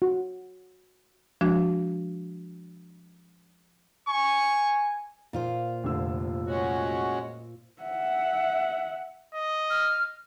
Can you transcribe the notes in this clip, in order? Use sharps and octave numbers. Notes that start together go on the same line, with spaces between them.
F#4
F3 G#3 D4 F#4
G#5 C#6
A#2 F4 C5
F1 D3 E6
G#3 C#4 F#4
E5 F#5
D#5
F6